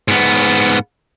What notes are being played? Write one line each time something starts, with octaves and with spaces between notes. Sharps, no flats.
G#2 B3